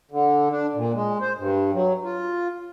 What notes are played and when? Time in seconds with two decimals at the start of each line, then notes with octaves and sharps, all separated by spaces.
0.11 D3
0.51 D4
0.75 A#2
0.94 G#3
1.21 C5
1.38 G2
1.74 F#3
2.04 F4